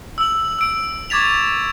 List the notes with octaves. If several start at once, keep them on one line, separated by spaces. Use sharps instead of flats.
E6 F#7
E6 D7
C#6 D6 G#6 A6 B6 F7